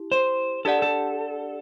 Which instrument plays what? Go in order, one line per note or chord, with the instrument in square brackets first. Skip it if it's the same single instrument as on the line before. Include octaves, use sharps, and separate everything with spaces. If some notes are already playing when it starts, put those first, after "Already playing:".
Already playing: [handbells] E4 G4
[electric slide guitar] C5
[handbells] D4 G4 D5 F#5 [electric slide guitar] A4
[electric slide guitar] A4